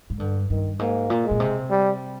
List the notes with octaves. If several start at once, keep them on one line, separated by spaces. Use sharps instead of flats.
G#2
G2 D3
G2 D#3
G#2 A#3
A#2
G#3
A#2
C3
G3